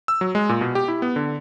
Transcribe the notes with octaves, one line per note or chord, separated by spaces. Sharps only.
E6
F#3
G#3
A#2
B2
G4
E4
B3
D3